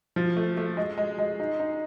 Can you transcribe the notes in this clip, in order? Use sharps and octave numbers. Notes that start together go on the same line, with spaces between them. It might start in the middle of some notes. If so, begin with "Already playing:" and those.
F3
A3
A3
G#3
G#3
G#3
D#4
D#4